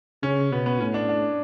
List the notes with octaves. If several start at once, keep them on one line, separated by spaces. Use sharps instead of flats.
C#3 C#4
B2 B3
B3
A2 C#4
D4
D4